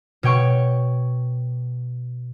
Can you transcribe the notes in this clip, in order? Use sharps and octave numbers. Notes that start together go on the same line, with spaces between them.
B2 C#5 G5 C#6